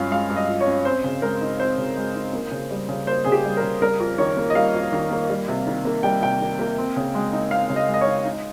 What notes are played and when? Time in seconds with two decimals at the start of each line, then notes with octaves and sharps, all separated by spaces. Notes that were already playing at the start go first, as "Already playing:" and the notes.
Already playing: G2 F3 G#3 C#4 F5
0.11 G#3 F5
0.30 G2
0.36 D#5
0.48 F3
0.61 C#5
0.67 C#4
0.85 C4 C5
1.04 C#3
1.22 G#3 A#4
1.41 D#4
1.60 C4 C5
1.78 C#3
1.96 G#3
2.15 D#4
2.33 A#3
2.52 C#3
2.71 G3
2.89 C#3
3.07 A#3 C5
3.25 C#3 G#4
3.32 G4
3.44 G3
3.57 A#4
3.63 C#3
3.82 G3 A#4
4.00 F2
4.18 D#3 C#5
4.37 A#3
4.50 D#5
4.55 G3 F5
4.74 F2
4.92 D#3
5.11 A#3
5.30 G3
5.48 C3
5.67 D#3
5.85 A#3
6.03 G3 G5
6.22 C3 G5
6.40 D#3
6.59 A#3
6.78 C4
6.96 C#3
7.15 G#3
7.33 D#4
7.51 C4 F5
7.70 C#3
7.76 D#5
7.88 G#3
7.94 D#5
8.01 C#5
8.07 D#4
8.25 D#4